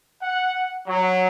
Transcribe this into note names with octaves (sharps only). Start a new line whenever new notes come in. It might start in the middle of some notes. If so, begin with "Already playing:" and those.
F#5
F#3